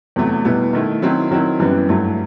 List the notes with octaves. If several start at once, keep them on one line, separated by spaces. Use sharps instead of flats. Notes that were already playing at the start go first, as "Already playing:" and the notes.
E2 C3 F#3 A3
B2 G3 B3 E4
D#3 A3 E4
D#3 F#3 C4 E4
D#3 F#3 C4 E4
F#2 E3 G3 B3
G2 F#3 A3 E4